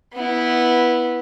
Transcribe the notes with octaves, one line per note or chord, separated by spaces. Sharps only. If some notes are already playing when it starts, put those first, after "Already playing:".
B3 E4